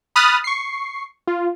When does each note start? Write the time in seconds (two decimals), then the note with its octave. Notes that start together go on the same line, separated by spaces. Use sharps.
0.16 B5 D#6 F6 F#6 A6
0.44 C#6 C7
1.27 F4